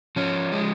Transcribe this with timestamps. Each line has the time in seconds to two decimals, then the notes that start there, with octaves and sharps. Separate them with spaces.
0.16 F3 C#4
0.52 G#3